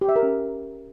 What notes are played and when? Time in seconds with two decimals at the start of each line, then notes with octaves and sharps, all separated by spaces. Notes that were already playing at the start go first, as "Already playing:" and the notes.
0.01 G4
0.09 E5
0.16 A#4
0.23 C#4